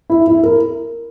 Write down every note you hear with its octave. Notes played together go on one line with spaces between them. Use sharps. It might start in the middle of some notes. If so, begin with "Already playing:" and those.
E4
E4
A#4